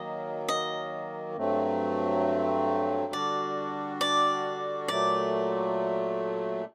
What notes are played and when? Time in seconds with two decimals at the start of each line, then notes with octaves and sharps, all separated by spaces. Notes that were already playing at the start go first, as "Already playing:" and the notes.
Already playing: D#3 F#3 A#3 D#5
0.49 D#5
1.37 G2 F#3 A3 C4
3.13 D3 G3 D4 F#4 D5
4.01 D5
4.88 A#2 F#3 A3 D5